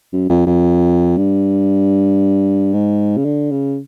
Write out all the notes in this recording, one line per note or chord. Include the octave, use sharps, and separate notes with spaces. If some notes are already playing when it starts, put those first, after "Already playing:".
F#2
F2
F2
G2
G#2
C#3
D3
C#3